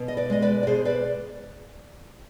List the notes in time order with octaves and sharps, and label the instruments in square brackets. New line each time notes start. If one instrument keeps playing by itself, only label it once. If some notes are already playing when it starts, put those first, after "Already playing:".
Already playing: [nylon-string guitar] B2
D#5
B4 D5
G#3 D#5
B4 D5
D5
B2 G#4 C5
B4 D5